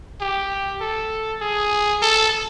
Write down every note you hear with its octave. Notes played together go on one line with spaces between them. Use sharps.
G4
A4
G#4
A4